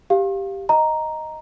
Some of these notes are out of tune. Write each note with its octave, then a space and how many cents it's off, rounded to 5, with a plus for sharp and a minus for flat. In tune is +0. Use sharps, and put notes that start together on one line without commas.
G4 +0 F5 +0
D#5 +0 A#5 +0